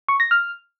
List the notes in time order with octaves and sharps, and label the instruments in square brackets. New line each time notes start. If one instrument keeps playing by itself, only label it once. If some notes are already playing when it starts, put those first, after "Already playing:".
[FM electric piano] C#6
A#6
F6